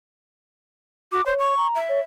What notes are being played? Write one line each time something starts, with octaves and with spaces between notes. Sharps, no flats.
F#4 D6
C5 C#5
C#6
A#5
E5
C#5